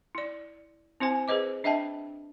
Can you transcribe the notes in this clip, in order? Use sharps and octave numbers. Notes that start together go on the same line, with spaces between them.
E4 D5
C4 E4 C5 G#5
G#4 B4 C5 D#5 D6
D4 D#5 E5 G5 A5